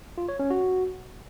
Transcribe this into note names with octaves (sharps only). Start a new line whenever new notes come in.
F4
C#5
C#4
F#4